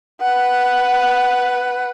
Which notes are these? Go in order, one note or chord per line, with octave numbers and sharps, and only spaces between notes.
B4 F#5